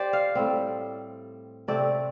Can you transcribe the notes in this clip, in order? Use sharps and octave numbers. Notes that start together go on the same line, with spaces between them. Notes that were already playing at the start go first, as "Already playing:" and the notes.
Already playing: G4 C5 D5
F5
A2 G3 C4
C3 A3 C4 D5